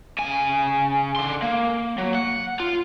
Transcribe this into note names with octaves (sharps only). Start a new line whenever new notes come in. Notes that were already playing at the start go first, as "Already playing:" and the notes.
C#3 G#5
D3 C6
A#3
F#3
F#5
F4